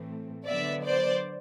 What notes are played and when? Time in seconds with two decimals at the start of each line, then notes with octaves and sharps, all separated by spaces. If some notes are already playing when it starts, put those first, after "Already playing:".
Already playing: A2 E3 A3 C4
0.47 D3 F#3 B3 D5 E5
0.85 C5 D5